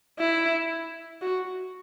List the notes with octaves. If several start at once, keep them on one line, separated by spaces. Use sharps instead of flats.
E4
F#4